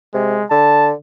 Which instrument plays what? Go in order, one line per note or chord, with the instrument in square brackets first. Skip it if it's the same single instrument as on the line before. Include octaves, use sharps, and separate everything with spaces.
[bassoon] C3 [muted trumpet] G#3
[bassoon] D3 [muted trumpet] A5